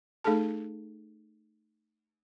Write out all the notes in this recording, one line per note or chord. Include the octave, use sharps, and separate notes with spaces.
A3 D#4 G#4 A4 A5